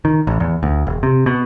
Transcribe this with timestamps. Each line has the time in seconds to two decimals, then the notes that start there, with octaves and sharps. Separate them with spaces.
0.05 D#3
0.27 A1
0.40 E2
0.63 D2
0.87 E1
1.03 C3
1.26 B2